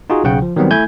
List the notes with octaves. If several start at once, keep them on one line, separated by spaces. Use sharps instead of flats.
D#4 F4 F#4 G#4
B1 C#3 F#5 G5
F3
D#3 F#3 G3 B3 C4
A3 E4 G#5 G6 G#6